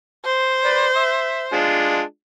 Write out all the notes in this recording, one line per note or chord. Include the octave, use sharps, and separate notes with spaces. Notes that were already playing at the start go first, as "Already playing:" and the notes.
C5
B4 D5
E5
G#3 D4 F4